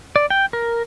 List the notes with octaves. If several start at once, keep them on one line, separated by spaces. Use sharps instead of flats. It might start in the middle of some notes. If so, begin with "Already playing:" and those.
D5
G5
A#4